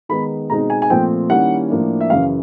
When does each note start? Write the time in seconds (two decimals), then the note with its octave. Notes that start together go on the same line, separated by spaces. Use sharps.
0.09 D#3 G#3 B3 D#4 B5
0.50 B2 G#3 C4 D#4 A#5
0.70 G#5
0.82 G#5
0.90 A#2 F3 A3 C4 G5
1.30 D#3 G3 A#3 C#4 E4 F#5
1.70 A2 F3 A#3 D4
2.01 E5
2.10 F#2 C#3 E3 F5